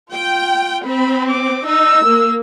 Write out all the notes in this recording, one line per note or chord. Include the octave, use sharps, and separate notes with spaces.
F4 G5
C4 B5
D6
D#4 E6
A#3